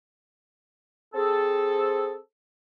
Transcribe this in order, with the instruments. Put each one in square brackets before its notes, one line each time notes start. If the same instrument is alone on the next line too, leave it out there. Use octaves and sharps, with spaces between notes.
[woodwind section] C4 G#4 A4